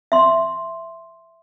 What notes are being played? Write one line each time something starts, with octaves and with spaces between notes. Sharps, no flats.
E5 C6